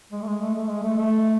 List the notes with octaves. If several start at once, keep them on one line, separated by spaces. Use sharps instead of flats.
G#3
A3
G#3
A3
A3
G#3
A3
A3